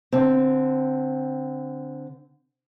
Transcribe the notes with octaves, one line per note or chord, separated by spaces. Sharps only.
D3 C4